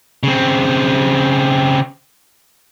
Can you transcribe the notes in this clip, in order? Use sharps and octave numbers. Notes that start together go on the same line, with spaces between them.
C#3 C4